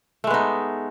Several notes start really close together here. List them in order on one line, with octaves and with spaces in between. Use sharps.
A3 G#3 B3 D#4